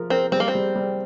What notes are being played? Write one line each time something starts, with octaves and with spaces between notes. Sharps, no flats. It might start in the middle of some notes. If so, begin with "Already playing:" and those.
Already playing: F3 A#4
C4 A#4
G3 C4
A#3
C4
G3
G3